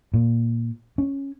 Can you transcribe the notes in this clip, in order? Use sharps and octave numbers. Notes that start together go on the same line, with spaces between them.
A#2
C#4